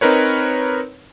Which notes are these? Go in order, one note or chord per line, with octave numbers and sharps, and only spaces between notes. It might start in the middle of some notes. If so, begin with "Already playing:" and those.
C4 D#4 A#4 B4 C#5